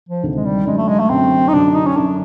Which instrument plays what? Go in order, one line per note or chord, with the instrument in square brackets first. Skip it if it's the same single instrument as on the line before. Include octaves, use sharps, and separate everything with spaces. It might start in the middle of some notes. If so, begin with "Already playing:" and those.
[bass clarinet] F3
[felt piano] D2 C3 D#3
[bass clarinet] G#3
G3
[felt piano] F#2 D3 F#3 [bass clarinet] G#3
[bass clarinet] A3
G#3
A3
[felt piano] F#2 D3 F#3 [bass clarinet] C4
[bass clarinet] D#4
[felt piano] F#2 D3 F#3 [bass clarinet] D4
[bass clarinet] D#4
C#4
[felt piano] F#2 D3 F#3 [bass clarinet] D4